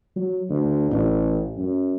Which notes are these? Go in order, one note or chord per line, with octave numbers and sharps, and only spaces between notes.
F#3
D2
A1
F#2